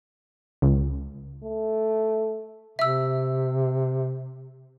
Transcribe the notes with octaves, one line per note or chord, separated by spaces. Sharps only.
C#2
A3
C3 E5 E6